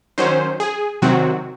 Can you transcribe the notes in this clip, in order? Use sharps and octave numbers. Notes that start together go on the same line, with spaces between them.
D#3 F#3 C#4 C5
G#4
C3 D#3 F#3 C4 F#4